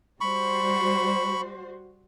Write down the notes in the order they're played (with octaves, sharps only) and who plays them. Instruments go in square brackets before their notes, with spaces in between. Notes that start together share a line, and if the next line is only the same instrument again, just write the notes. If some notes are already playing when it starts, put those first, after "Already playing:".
[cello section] G3 F#4 C5 [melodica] B5 C#6